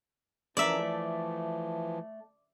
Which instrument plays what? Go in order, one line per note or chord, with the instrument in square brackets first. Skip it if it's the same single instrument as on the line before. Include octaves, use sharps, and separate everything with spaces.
[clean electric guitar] C#3 A#4 [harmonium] E3 F3 [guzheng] D5 E5
[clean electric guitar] A3